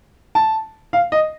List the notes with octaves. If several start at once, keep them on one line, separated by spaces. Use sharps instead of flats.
A5
F5
D#5